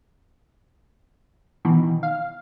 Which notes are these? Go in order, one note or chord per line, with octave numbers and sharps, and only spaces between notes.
B2 D#3 E3
F5